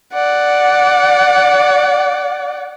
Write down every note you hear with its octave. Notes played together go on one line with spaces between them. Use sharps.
D5 F#5